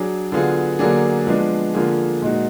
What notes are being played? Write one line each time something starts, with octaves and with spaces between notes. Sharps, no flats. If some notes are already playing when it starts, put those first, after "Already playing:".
Already playing: F#3 D4 G#4
D3 F#3 B3 F4 G#4
D3 F#3 A#3 D4 G#4
F3 G#3 B3 D4
D3 F3 A#3 F4 G#4
A#2 G#3 D#4 F#4